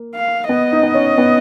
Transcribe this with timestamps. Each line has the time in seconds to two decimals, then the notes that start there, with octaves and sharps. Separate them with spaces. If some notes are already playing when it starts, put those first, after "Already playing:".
Already playing: A#3
0.15 F5
0.49 B3 D#5
0.72 D#4
0.83 B3
0.94 C#4
1.18 B3